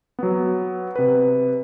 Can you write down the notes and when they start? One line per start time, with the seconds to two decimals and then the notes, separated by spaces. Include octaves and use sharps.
0.19 F#3 B3
0.96 C3 B4